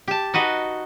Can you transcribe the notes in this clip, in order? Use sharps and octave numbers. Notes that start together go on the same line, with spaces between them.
G4 A5
D#4 F#4 B4 D#5